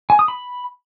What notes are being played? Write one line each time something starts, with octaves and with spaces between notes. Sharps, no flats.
G#5
D#6
B5